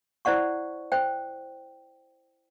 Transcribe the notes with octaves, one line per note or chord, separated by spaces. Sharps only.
E4 C5 D5 F#5 C#6
C5 G5